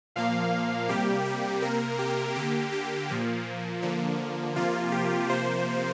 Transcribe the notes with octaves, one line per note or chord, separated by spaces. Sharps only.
A#2 F3 A#3 F5
C3 G3 A#3 G4
G4
C3 A#3 A#4
G4
D3 A#3 G4
G4
A#2 F3 A#3
D3 F3 A#3
C3 F3 A#3 F4
G4
C3 F3 A#3 C5